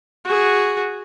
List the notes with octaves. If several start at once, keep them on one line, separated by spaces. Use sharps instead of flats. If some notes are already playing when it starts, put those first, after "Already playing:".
F#4 G#4